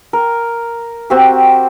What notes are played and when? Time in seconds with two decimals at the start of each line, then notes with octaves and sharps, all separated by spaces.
0.13 A#4
1.10 C4 F#4 G4